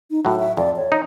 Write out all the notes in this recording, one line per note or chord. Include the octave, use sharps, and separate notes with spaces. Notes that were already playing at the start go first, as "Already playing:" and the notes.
D#4
A2 F#3 F#4
E5
F2 D5
C#5
D#4